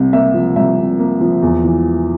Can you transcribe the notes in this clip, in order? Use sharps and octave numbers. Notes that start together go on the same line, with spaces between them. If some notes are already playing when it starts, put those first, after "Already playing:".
Already playing: C2 C3
A#3 E5
F3
C2 E5
C3
A#3
F3
E2
E3